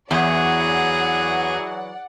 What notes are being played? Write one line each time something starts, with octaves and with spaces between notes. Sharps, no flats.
E2 E3 F#3 G#4 D5 F#5